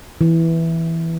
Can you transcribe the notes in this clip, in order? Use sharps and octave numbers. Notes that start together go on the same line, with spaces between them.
E3